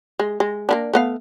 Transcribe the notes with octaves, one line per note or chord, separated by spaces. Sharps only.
G#3
G#3
A#3 B3 D4
A3 B3 F5